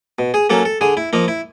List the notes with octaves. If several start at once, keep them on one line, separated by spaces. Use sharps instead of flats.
B2
G#4
F#3 A#3 C#4 A4
A4
D3 G#4
E4
F3 A#3 D#4
E4